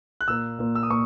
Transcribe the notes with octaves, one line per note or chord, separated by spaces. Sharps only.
F#6
A#2 A#3 E6
A#2 A#3
E6
D#6
A#2 A#3 C#6